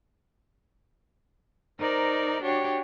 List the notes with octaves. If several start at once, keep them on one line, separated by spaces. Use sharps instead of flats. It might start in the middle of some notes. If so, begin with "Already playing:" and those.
D#4 A#4 C5 D5
D4 F#4 G4 C#5